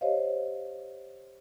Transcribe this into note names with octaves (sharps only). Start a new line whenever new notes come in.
G4 C5 C#5 D#5 F5